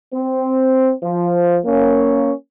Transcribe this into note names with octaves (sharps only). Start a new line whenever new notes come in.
C4
F3
A#3 C#4